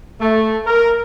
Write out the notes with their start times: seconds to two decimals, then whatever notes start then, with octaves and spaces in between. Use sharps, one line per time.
0.20 A3
0.66 A#4